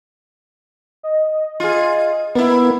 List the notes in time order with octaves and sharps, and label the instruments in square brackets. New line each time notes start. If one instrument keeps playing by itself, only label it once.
[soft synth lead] D#5
[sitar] F4 G#4
[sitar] A#3 E4 [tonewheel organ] B3 [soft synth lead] A#4